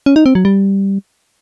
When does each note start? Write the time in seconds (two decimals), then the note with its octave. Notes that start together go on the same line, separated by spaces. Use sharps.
0.06 C#4
0.16 D#4
0.26 C4
0.35 F#3
0.45 G3